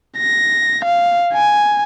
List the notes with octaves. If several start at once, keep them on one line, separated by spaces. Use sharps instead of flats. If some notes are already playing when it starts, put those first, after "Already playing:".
A#6
F5
G#5